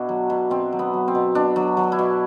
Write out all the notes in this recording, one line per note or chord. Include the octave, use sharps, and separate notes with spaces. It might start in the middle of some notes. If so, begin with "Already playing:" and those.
Already playing: B2 D4 E4 F#4
F#3
B2
B2 C4
F#3
B3
F#3
C4
B2
B2 D4
F#3
F#3
E4
B2